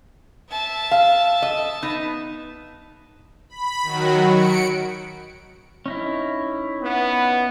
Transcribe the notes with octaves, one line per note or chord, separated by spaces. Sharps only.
E5 A5
F5
D#5
B3 D#4
B5
D#3 F#3 F#4
C#7 D7
C#4 D#4 E4
B3